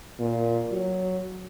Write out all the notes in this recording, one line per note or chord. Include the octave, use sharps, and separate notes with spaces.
A#2
F#3